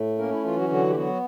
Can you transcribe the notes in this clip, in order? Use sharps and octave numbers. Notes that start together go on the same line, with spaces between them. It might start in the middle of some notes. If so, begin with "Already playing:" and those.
Already playing: A2 A3
A#3 C#4 A#4
E4
E3 F4
F#3 F#4
D3 F#3 F#4
G4
F#3 B3 F#4